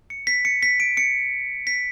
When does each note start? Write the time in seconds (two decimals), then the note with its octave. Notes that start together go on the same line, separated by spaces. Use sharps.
0.10 C#7
0.27 B6
0.45 C#7
0.63 B6
0.80 D7
0.97 C#7
1.67 B6